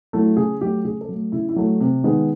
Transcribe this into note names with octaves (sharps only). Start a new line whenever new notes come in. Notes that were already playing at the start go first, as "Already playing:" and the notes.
F#3 A3 E4
C#3 G#4
F#3 A3 G4
C#3 G#4
A4
F#3 A3
C#3 E4
E4
F#3 A3
C3
D#3 G#3 B3